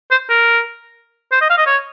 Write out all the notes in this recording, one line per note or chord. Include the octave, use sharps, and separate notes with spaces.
C5
A#4
C5
D#5
F5
D#5
C#5